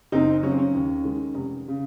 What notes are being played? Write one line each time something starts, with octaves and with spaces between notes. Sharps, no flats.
F#1 C4 D#4
F#2 C#3 F#3 C#4
C4
C#4
D#2
D#3 G#3
F1
C#3